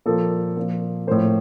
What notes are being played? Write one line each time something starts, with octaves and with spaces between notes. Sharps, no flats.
A#2 F3 A#3 A4
A#2 F3 A#3
A2 F3 A#3 C5